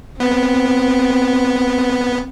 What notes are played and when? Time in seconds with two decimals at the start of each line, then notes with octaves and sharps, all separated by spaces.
0.20 B3 C4